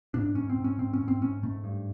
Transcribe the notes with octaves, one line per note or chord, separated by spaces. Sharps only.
G#2 D4
G#2 C#4
C4
G#2
C#4
G#2 C4
C#4
G#2
C4
G#2 C#4
G#2 A3
G2